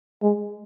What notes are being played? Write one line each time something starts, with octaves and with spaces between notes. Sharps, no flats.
G#3